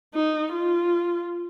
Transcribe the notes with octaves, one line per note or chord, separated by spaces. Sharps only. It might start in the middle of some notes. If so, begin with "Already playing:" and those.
D#4
F4